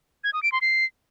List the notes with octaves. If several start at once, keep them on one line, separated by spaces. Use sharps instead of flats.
G#6
D#6
D7
C6
C7